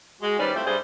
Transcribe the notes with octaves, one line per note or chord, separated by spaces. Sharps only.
G#3 F#4
D#3 G3 C#4 B4 C5 D5
A3 C4 E4 F4 G4 C5
G2 G3 A3 D4 G#4 C5